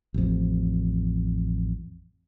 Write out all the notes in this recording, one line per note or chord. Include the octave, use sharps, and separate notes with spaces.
A1 F2